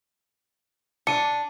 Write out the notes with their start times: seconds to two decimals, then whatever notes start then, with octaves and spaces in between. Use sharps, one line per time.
1.07 D4 C#7 D#7